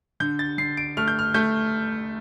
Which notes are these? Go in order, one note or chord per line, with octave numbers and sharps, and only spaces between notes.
D3 G6
A6
D3 C7
D7
A3 F6
G6
F6
A3 G6